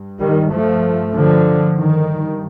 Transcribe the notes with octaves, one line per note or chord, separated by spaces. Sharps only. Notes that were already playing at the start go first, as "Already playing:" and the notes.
Already playing: G2
D#3 G3
F3 A3
D3 F3
G2 D#3